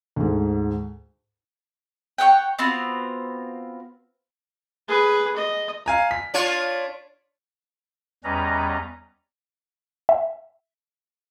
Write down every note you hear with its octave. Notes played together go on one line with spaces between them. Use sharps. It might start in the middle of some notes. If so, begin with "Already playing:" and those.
D2 G#2
C#5 D#5 F#5 G5
B3 C4 F4 F#4
G#4 B4
D#5
F5 G#5 A#5
B6
D4 F4 C#5
E2 G3 C#4 B4 D#5 A#5
E5